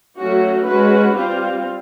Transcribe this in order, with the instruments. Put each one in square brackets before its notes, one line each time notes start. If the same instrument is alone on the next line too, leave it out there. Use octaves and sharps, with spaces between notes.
[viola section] F#3 A3 C#4 F#4
G#3 C#4 F#4 B4
G3 C4 F4